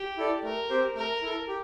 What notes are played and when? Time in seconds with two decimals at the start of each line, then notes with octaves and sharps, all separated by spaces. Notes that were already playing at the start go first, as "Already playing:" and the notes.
Already playing: G4
0.17 E4 A4 D5
0.43 A3 A#4
0.70 C4 G4 C5
0.96 A3 A#4
1.22 E4 A4
1.48 G4